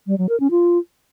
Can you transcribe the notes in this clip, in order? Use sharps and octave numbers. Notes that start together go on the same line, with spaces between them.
G3
F#3
A#4
C#4
F4